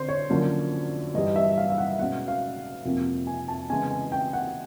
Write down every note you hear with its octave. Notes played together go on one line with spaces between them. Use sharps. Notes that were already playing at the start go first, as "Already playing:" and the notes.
Already playing: D3 C4 C5
C#5
F#2 D3 F3 A#3 C#4
G2 E3 G3 D#5
E5
F5
F5
F#5
B2 G#3 C#4 F#5
F5
F2 C3 F3 A#3
G#5
A5
C#3 E3 G#3 B3 G#5
G#5
G5
F#5